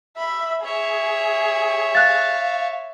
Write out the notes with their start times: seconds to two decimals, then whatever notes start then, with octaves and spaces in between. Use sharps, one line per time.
0.17 E5 B5
0.64 G#4 C#5 E5
1.95 F5 F#6 A6